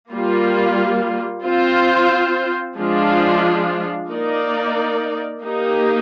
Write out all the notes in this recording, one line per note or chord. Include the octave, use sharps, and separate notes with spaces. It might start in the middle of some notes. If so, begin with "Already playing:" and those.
G3 A#3 F4
C4 F4 C5
F3 G#3 D4 F4
A#3 D#4 A#4 D5
A#3 D#4 G4